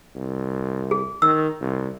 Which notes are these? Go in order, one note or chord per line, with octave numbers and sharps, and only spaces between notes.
C2
G#4
D#3 E6
C2